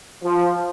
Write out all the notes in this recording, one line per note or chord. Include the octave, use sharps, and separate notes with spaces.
F3